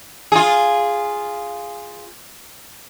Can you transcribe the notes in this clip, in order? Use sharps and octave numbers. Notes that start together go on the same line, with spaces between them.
F4 G#4